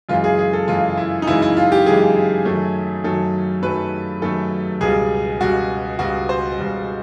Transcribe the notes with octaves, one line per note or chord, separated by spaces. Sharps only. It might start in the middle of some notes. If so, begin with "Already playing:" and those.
F#2 C#3 E3 G#3 F4
G#4
G#4
A4
F#2 C#3 E3 G#3 F4
E4
D#4
F#2 C#3 E3 G#3 E4
E4
F4
G4
F#2 C#3 E3 G#3 G#4
F#2 D#3 F#3 A3
F#2 D#3 F#3 A3 A4
F#2 D#3 F#3 A3 B4
F#2 D#3 F#3 A3 A4
C#2 B2 G3 G#4
C#2 B2 G3 F#4
C#2 B2 G3 F#4
C5
C#2 B2 G3